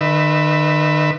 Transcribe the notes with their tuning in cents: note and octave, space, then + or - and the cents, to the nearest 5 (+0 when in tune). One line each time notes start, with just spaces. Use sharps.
D#3 -40 B4 +0 E5 +0